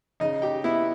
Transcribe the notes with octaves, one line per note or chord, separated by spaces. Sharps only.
C#3 D#4 D#5
G4 G5
B3 E4 E5